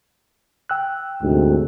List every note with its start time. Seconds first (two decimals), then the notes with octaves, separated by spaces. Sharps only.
0.69 G5 E6 F#6
1.22 D2 G#2 C3